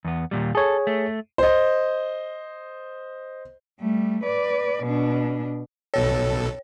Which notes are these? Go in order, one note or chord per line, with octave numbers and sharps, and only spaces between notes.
E2 B3
D#2 A#2 G3
G#4 A4 C#5
A3
C5 D#5
G3 A3
B4 D5
B2 D4
B1 B2 A4 C#5